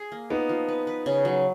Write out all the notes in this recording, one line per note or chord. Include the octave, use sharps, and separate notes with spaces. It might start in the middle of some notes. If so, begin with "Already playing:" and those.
Already playing: G#4
A#3
F3 B3 D#4
F3
B4
B4
C#3
F#3